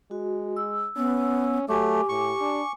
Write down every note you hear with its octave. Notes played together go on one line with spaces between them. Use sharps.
G#3 F#4
E6
B3 C#4
F#3 A3 G4 G#5 D6
A2 C#6
D4